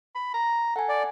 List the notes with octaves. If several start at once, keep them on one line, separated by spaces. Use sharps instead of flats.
B5
A#5
A4 F#5 G#5
D5